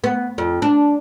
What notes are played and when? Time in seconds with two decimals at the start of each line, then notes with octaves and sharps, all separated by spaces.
0.04 B3
0.38 F2
0.62 D4